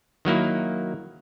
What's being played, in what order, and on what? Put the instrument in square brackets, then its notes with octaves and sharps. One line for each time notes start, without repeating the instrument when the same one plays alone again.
[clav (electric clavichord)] D#3 F#3 A#3 E4